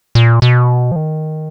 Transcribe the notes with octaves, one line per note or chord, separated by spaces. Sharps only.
A#2
B2
F3
D#3